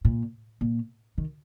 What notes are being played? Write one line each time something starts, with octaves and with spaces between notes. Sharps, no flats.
A#2
A#2
D#3